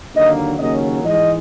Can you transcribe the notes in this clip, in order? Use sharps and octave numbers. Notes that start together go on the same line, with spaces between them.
D#2 D3 F#3 A#3 D#5
D#2 C#3 F#3 A#3 C#4 D#5
G#2 E3 G#3 D#5